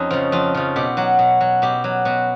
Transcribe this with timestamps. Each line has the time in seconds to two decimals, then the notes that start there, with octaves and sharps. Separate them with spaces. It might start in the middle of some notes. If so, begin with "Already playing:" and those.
Already playing: F2 C#4 D#4
0.11 C#3 F3
0.32 F2 F4
0.55 C#3 F3
0.76 B2 G4
0.97 F#3 F#4
1.19 B2
1.41 F#3
1.62 B2 G4
1.84 F#3
2.05 B2 F#4